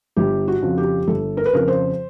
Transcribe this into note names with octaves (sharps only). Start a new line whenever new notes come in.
G1 G4
F#4
F2 C#3 F3
G4
G1 A4
A#4
B4
F2 C#3 F3 A#4
C5